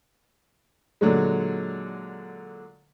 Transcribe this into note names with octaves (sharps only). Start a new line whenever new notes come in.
A#2 D3 F#3 G#3